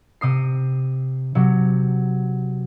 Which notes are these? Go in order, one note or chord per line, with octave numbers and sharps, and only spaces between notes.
C3 D#6 C7
C3 F#3